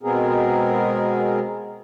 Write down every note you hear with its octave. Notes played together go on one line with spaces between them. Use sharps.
B2 G#3 B3 C4 G#4 A#4